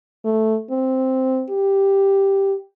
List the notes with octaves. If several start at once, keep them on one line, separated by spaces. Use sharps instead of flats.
A3
C4
G4